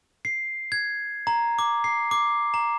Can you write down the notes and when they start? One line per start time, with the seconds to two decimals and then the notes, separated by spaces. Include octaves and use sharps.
0.25 C7
0.72 G#6
1.27 A#5
1.59 D6
1.84 C7
2.11 D6
2.54 A#5